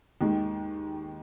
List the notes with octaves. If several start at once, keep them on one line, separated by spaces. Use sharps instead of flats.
D#2 D#3 G#3